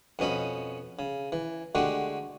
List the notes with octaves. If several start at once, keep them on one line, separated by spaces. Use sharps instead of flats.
F2 B2 C#4 D#5 B5
C#3
E3
D3 G#3 A3 F#4 G4